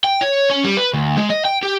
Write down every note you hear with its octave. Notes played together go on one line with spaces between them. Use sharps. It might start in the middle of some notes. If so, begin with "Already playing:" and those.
G5
C#5
C#4
G3
B4
D2
G#3
D#5
G5
G4